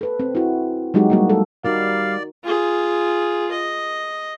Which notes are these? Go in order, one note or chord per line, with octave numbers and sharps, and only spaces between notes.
A4 B4
C4
E4 F#4
F#3 G#3 D#4 F#4 G4
G3 A#3 F#4
A4
G3 D#4 F#4 A#4 D5 F5
F4 G#4
D#5